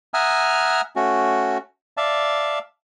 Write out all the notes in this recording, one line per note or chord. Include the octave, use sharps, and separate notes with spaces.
E5 F#5 G#5 A#5 D#6 F6
A3 C#4 F#4
D5 E5 F5 A5